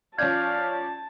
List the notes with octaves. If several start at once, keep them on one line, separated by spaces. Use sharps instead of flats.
F3 C#4 D5 F5 A5 G6 G#6